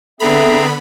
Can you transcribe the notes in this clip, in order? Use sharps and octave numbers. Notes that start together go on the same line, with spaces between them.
D3 B3 C4 G#4 A4 E5 A#5 B5